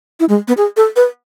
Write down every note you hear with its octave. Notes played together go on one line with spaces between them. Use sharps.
E4
G#3
B3
G#4
A4
B4